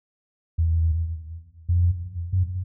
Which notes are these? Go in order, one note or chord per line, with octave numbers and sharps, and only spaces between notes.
E2
F2
F#2